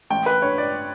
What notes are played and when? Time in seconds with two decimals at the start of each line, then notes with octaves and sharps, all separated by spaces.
0.10 A1 G5
0.26 B4
0.42 G2 C#5
0.58 D5